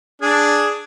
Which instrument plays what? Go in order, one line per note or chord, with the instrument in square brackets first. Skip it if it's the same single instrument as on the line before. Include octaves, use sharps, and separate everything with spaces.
[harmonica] D4 G#4